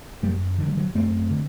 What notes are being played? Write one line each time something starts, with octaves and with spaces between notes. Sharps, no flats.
F#2 G3 A#3
D3 D#3
G3
D3 F#3
F#2 A3 C4
D3